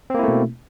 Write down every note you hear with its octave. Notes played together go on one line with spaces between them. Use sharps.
B2 A3 A#3 C4 E4